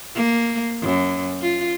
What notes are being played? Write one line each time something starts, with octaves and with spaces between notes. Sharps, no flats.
A#3
F#2
F4